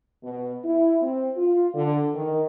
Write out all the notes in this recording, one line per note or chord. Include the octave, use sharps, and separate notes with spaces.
B2
E4
C4
F4
D3
D#3